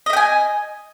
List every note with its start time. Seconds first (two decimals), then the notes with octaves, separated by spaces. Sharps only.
0.06 D#5
0.10 E5
0.13 G5
0.17 G#5